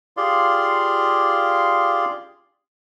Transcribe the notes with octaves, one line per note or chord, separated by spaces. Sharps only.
F4 G4 G#4 D5 F5 C6